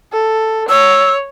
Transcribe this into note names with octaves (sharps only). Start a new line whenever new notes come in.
A4
C#5 E6